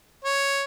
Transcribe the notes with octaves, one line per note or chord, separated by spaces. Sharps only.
C#5